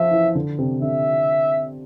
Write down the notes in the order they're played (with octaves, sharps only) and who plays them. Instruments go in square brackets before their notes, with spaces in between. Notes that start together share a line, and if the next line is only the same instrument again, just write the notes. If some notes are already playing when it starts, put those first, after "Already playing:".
Already playing: [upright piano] F3 [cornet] E5
[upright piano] E3
D3
C3
[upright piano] D3 [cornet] E5